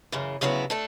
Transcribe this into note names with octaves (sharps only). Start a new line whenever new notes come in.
F#2 C#3 E3
D2 C#3 F#3 B3 E4
A3 D4 A4